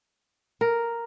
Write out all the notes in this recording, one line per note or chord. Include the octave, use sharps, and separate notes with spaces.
A#4